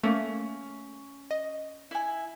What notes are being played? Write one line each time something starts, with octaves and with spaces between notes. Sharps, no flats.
A3 A#3 C#4
D#5
E4 G#5